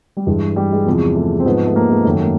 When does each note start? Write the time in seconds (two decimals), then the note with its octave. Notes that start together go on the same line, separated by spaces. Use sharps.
0.17 G3
0.27 G2 E3 G#3
0.56 G3
0.72 G#3
0.86 E2 C3 F3
1.16 A3
1.40 C4
1.46 G#2 F3 B3
1.66 A3
1.76 A#3
1.90 G#3
2.05 F#2 D#3 F#3 A3
2.20 A#3